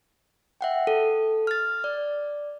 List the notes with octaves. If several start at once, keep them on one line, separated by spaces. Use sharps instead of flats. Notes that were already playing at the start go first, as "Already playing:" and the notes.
E5 F#5 G5
A4
F6 A6
D5